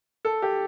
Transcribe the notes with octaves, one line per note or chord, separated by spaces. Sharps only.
A4
G4